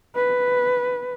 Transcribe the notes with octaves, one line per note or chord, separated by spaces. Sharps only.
B4